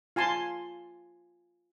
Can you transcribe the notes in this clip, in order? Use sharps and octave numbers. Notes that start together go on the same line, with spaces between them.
F4 G#5 A5 C6